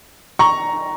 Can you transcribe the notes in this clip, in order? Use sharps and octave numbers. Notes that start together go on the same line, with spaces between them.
A#5 C#6